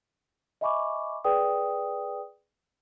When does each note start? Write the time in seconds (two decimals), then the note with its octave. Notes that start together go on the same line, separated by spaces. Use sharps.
0.61 D#5 E5 G#5 B5 C#6 D6
1.24 G#4 B4 D5 G5 D#6